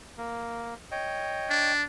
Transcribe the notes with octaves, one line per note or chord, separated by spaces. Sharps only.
A#3
C#5 D#5 G5
D4